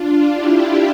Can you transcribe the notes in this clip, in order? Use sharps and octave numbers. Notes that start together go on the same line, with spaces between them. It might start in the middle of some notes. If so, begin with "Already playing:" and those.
Already playing: D4 F4
E4 G4